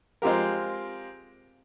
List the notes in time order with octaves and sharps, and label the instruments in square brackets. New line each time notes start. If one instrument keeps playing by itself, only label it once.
[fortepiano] G#3 C4 F4 G4 A#4